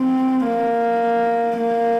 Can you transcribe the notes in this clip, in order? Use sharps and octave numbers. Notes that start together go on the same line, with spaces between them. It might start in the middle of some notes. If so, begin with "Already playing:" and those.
Already playing: C4
A#3
A#3